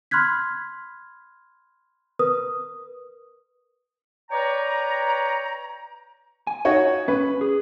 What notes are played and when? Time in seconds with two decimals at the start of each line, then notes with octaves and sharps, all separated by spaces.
0.11 B5 C6 F6 F#6 G#6 B6
2.19 A#4 B4 D#6
4.31 B4 C#5 D5 G5 A#5
6.47 G#5
6.65 D#4 F#4 C#5
7.08 C#4 B4
7.41 G#4